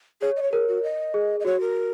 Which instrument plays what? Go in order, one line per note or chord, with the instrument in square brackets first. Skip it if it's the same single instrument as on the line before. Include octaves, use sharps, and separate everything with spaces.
[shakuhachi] G#4 [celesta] C#5
[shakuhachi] D#5
C#5
[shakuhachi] G#4 [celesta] A#4
[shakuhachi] F#4
D#5
[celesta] G#4
[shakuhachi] D#5
[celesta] F#4 [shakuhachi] C#5
[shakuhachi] A#4